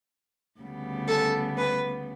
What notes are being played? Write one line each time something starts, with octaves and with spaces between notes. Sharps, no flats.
D2 C#3 G3 B3
A4
B4